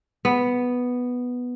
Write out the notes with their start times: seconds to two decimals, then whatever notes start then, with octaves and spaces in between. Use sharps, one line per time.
0.25 B3